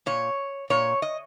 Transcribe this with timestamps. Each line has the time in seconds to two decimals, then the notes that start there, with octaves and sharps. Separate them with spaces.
0.06 A#2 C#5
0.70 A#2 C#5
1.02 D#5